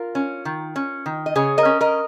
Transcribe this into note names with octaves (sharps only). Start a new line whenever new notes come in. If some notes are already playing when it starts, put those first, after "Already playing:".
Already playing: F4 A#4
C#4
D#3
C#4
D#3
D#5
C#3 G#4 C#5
A#4 D#5
C#4
A#4 D#5